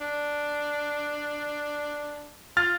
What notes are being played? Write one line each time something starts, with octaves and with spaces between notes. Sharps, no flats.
D4
F4 F6 A6